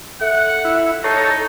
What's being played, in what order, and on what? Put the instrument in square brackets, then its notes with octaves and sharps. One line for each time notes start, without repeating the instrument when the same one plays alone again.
[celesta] A4 E5 [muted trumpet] F#5
[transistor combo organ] E4
[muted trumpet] D#4 [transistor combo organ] A4 C#5 A#5 [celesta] C7